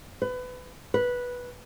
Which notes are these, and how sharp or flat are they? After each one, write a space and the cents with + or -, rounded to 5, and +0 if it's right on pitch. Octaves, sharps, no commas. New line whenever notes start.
B4 +25
B4 -10